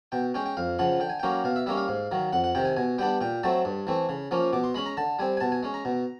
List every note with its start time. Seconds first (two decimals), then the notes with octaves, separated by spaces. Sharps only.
0.12 B2 G5
0.34 G#3 C#4 G5
0.46 G5
0.57 F2 F5
0.79 C#3 F3 F#5
1.00 D3 G5
1.10 G#5
1.20 F#3 A#3 C#4 G5
1.44 B2 F5
1.56 E5
1.66 G3 A#3 C#4 E5
1.77 F5
1.88 G#2
2.11 D#3 F#3
2.33 F2 F#5
2.44 F#5
2.55 C3 D#3 G5
2.65 G#5
2.76 B2 G#5
2.98 G3 B3 D4 G5
3.21 A#2 G5
3.43 F#3 A3 C4 A5
3.65 G2
3.87 E3 A3 C4
4.09 C#3
4.31 F3 A#3 C#4
4.53 B2 D6
4.64 C6
4.74 G#3 C#4 B5
4.86 A#5
4.97 D3 A5
5.19 G3 C4 G#5
5.37 G#5
5.40 B2 A5
5.52 G#5
5.63 G#3 C#4
5.74 A#5
5.85 B2